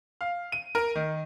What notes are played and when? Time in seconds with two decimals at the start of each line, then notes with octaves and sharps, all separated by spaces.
0.21 F5
0.52 D#7
0.75 A#4
0.95 D#3